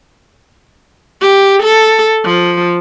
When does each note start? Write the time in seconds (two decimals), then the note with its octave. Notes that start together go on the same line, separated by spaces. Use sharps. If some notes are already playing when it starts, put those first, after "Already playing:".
1.21 G4
1.63 A4
2.25 F3